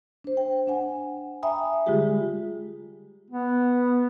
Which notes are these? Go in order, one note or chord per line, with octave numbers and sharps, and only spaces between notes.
D4 C5
G5
D4 F#5 G#5
E5 G5 G#5 A#5 B5 D#6
D3 G3 G#3 F4 G4 G#4
B3